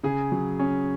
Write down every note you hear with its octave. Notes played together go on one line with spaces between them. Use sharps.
C#3 G#4
F#3
C#4